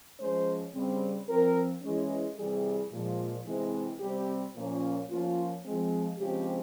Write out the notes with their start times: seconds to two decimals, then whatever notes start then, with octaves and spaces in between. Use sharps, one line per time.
0.18 F3 G#3 C#4 C5
0.74 C#3 G3 C4
1.28 F3 C4 A#4
1.82 E3 G#3 C#4
2.37 C3 E3 G3 G#4
2.92 A#2 F3 G#3
3.46 C3 E3 G#3 C4
4.00 C3 G3 C4 G4
4.55 A#2 F3 A#3 C#4
5.10 F3 A#3 C#4 F4
5.64 F3 G#3 C4
6.18 C#3 F3 G#3 C4 G4